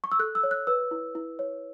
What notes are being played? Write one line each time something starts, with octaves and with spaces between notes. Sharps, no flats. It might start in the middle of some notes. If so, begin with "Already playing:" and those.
C#6
E6
A4 F#6
E6
C#5
F#6
B4 E6
E4
E4
C#5